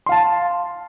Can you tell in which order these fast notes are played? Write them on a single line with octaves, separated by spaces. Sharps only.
C6 F5 A5